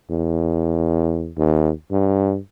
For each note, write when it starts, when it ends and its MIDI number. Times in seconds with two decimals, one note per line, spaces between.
0.10 1.32 40
1.37 1.71 39
1.91 2.37 43